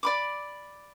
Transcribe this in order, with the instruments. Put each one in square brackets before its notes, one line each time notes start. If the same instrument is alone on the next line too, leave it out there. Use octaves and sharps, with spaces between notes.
[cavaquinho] D5 B5 D6